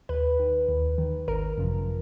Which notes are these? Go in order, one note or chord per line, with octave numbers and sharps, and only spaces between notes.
D#2 B4
D#3
D#2
D#3
G#1 A#4
F#2 C#3 F3